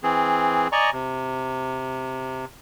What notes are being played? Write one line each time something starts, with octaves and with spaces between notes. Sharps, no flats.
E3 C4 G#4
D5 D#5 G#5 A#5 C#6
C3